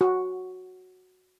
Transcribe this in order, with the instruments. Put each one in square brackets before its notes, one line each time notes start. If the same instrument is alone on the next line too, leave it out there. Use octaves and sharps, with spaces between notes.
[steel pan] F#4